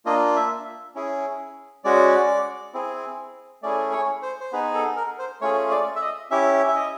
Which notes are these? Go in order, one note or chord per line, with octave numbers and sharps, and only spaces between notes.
A#3 D4 F4 D#5
E5
C#4 E4 G#4
G#3 C#4 F#4 D5
C4 E4 G#4
A3 C#4 E4 G#4 D5
C#5
C5
C5
B3 D#4 G#4 B4
A4
A#4
C5
A3 C#4 F4 G#4 C#5
D5
E5
D#5
C#4 E4 G4 E5
E5
D#5